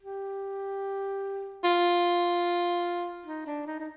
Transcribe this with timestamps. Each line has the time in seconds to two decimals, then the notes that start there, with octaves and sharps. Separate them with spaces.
0.03 G4
1.64 F4
3.26 D#4
3.46 D4
3.67 D#4
3.80 D#4